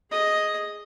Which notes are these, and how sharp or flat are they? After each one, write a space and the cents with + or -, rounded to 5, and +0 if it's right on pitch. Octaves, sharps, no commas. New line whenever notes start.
G#4 +0 D#5 +0